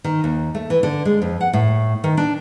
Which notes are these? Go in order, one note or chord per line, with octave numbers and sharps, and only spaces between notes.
D#3
D#2
A3
E3
D3
G#3
F2
F#5
A2
D#3
D4